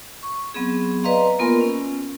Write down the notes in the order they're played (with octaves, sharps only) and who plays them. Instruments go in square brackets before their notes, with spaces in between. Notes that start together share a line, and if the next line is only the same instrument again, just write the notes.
[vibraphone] C#6
F#3 B3 C4 G#4
B4 D5 D#5 F5 A#5 C6
A#3 B3 F4 A#4 G#5 C6
C#4